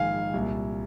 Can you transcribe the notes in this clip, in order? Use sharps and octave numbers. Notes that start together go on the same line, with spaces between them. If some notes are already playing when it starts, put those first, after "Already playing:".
Already playing: A#1 G#2 D#3 F5 G#5
C2 A#2